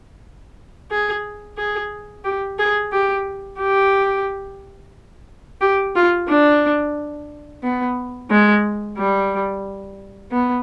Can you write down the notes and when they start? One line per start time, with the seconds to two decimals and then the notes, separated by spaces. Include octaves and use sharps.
0.91 G#4
1.58 G#4
2.25 G4
2.59 G#4
2.92 G4
3.60 G4
5.61 G4
5.96 F4
6.28 D4
7.63 B3
8.31 G#3
8.97 G3
10.32 B3